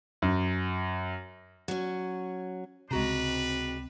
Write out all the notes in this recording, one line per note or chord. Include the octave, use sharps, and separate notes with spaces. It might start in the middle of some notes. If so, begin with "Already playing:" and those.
F#2
F#3 C#4
C#2 C3 G#3 C4 D4 F#4 B4 A#5